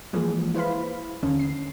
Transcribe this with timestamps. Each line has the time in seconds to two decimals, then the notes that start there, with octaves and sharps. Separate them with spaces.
0.13 E3 F3 G#3 A#3 G#4
0.55 E4 B4 C5 F5 B5
1.23 D#2 D3 D#3 C#4
1.39 C7